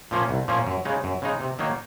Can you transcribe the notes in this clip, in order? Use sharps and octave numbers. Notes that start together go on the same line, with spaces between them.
A#2 F3 A#3 C#4
C2
A#2 F3 A#3 C#4
F#2
C#3 G#3 D#4
F#2
C#3 G#3 D#4
C3
D#3 F#3 A#3 D#4